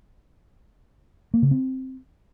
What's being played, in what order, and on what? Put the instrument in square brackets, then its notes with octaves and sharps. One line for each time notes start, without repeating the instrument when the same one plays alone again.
[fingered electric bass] A#3
C#3
C4